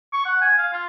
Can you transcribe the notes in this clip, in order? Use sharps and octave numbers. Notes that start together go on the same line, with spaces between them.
C#6
F#5
G#5
F5
F4